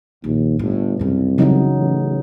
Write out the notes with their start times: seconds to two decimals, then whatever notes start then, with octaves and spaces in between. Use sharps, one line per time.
0.24 A#1 D#2
0.59 G1 A2
0.99 C2 F#2 C#3
1.38 F#2 C#3 E3 F#3 D#4
1.78 A1